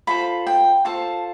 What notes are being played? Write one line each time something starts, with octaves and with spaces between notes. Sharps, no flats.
F4 A4 C5 B5
G5
F4 A4 C5 A5